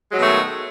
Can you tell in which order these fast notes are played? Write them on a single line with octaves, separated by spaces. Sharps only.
G#3 F#3 B2 D#3 A3